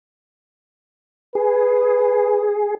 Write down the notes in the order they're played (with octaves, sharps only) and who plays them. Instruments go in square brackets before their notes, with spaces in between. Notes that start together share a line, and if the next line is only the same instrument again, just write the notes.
[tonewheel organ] G#4 [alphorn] B4